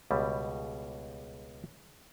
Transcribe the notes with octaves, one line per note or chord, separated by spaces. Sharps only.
C#2 B2 G3